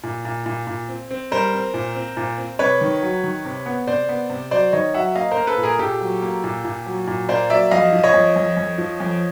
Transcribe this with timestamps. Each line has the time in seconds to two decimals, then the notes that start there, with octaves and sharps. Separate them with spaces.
0.04 A#2
0.25 A#2
0.46 A#2
0.67 A#2
0.89 C4
1.11 C4
1.31 G3 A#4 C5
1.53 C4
1.74 A#2
1.95 C4
2.17 A#2
2.38 C4
2.59 C3 B4 C#5
2.81 D#3
3.02 F#3
3.24 D#3
3.45 C3
3.66 B3
3.87 C3 C5 D5
4.09 B3
4.30 C3
4.51 F#3 C5 D5
4.73 D#3 C#5 D#5
4.94 F#3 E5 F#5
5.16 A#3 D#5 F5
5.31 A#4 C5
5.37 A#3
5.47 A4 B4
5.58 A#2
5.63 G#4 A#4
5.79 A#2 G4 A4
6.01 F#3
6.22 A#3
6.44 A#2
6.65 A#2
6.86 F#3
7.08 A#2
7.29 A#3 C5 D5
7.50 F#3 D5 E5
7.71 F2 D#5 F5
7.93 F3
8.03 C#5 D#5
8.14 F2
8.36 F2
8.57 F2
8.78 F3
9.00 F2